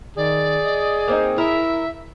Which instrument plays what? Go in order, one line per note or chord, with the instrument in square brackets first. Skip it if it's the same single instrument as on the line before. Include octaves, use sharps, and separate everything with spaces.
[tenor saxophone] D#3 [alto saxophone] G#4 [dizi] D5
[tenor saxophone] D#5
[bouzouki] A#3 C4 D#4
[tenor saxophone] E4 [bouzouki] A#4 [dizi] E5